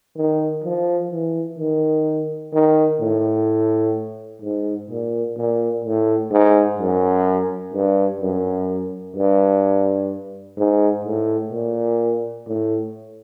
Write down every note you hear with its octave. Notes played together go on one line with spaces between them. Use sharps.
D#3
F3
E3
D#3
D#3
A2
G#2
A#2
A#2
A2
G#2
F#2
G2
F#2
G2
G#2
A2
A#2
A2